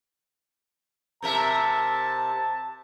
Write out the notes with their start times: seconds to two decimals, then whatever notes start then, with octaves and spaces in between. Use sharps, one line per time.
1.22 C3 A#4 E5 A5